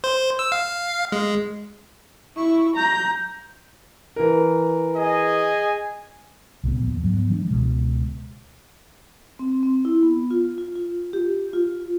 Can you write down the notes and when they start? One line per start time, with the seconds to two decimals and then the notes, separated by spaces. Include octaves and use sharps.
0.04 C5
0.39 E6
0.52 F5
1.12 G#3
2.37 E4 C#6
2.77 A#5 G6
4.16 E3 A#4
4.97 G#4 D#5 G#5
6.64 C2 A#2 F3 B3
6.82 D#2 F3
7.02 G#2 F#3 B3
7.30 E3 F3 G#3 D4
7.48 C#2 B2 G#3
9.39 C4
9.63 C4
9.85 E4
10.03 B3
10.31 F4
10.58 F4
10.75 F4
11.13 G4
11.53 F4